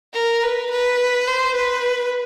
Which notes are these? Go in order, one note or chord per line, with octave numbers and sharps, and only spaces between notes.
A#4
B4
B4
C5
B4